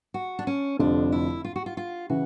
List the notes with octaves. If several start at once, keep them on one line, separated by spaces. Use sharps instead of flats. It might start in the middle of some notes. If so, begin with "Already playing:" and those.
F#4
D4
C#4
F1 F2 D3 F3 D4
E4
F4
F#4
F4
F4
C#3 E3 F#4